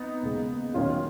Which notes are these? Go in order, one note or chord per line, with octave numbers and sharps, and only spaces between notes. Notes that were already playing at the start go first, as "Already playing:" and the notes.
Already playing: B3 D#4
D#2 C#3 G#3
D#2 D#3 F#3 C#4 F4
F4